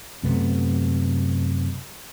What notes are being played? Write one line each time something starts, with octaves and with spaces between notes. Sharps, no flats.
F#2 C3 A3 B3